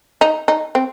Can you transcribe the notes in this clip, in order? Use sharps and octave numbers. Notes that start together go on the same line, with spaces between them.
D#4
D#4
C4